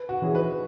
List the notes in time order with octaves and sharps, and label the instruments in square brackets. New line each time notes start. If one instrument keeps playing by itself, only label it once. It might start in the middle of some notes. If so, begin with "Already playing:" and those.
Already playing: [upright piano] B4
F#4
[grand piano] E3 C#4 G#4
[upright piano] B4